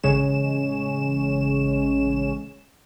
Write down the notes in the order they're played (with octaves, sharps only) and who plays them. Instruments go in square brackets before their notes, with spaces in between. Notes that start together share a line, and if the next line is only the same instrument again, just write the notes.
[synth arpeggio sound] A1 C#3 G#3 C#4 E7